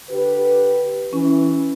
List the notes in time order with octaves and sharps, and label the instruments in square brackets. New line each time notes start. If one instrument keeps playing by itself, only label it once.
[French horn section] D3 G4 B4
[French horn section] E3 [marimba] C#4